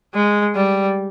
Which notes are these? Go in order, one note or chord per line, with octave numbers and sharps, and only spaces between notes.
G#3
G3